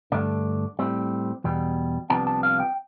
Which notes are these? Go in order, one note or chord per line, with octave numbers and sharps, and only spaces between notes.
G2 D3 A3 D4
A2 G3 C4
E2 B2 G3
C2 C3 F3 B3 D4 A5
A5
F5
G5